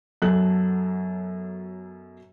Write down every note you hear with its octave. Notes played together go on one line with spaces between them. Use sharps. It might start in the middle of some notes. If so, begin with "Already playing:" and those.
F#2 B2 F#3 A4 F#6